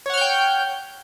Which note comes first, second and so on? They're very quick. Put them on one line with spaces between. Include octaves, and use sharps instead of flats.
C#5 F#5 F6 G6 G5